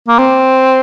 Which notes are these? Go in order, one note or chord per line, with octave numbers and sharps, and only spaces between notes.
A#3
C4